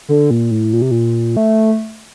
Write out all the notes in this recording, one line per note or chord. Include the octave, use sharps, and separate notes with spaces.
D3
A#2
A2
A#2
C3
A#2
A3